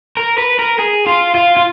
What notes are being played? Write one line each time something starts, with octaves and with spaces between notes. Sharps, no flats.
A#4
B4
A#4
G#4
F4
F4
F4